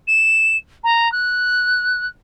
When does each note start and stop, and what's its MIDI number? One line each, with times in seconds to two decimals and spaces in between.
0.07 0.57 100
0.84 1.11 82
1.12 2.06 90